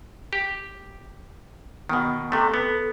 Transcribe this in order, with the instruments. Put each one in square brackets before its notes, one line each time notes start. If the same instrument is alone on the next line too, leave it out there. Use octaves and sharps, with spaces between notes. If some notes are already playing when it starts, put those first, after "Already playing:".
[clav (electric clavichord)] G4
[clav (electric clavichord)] B2 D#3 [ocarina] B3
[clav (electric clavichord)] C3 A3 [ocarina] A4
[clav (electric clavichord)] B3